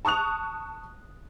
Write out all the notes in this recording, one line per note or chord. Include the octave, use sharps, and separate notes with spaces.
A5 C#6 D#6 F#6 F7